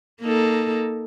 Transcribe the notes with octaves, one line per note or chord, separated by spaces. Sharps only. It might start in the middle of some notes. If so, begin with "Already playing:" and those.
A#3 D#4 A4